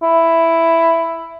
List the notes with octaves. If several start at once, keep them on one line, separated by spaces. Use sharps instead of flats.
E4